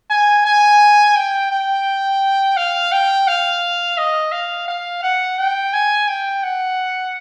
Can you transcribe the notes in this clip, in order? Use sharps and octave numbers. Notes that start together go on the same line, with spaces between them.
G#5
G#5
G5
G5
F5
G5
F5
D#5
F5
F5
F#5
G5
G#5
G5
F#5